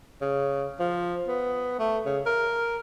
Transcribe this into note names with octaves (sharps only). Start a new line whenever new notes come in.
C#3
F3
B3
A3
C#3
A#4